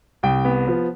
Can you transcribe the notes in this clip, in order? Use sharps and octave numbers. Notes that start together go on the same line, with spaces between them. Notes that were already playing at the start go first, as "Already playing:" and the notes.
C2 G5
B3
F3